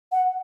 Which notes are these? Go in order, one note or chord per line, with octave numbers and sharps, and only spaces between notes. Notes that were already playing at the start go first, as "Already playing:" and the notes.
F#5